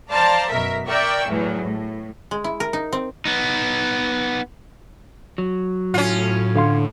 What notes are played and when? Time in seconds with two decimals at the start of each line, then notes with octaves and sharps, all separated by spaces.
0.10 C5 D5 F5 A5 A#5
0.50 F#2 B2 A#4 E5 B6
0.86 A#4 D5 E5 G5 C#6 E6
1.27 E2 A2 E3 F#3
1.63 A2
2.31 G#3
2.44 E4
2.60 A#4
2.73 D#4
2.93 C4
3.25 B3 D#4
5.38 F#3
5.94 A2 C#4 F4
6.56 D3 F5 C6